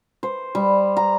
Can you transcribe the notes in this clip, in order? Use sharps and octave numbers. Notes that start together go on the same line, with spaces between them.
C5
G3
A#5